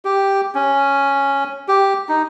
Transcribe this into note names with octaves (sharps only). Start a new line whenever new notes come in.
G4
C#4
G4
D#4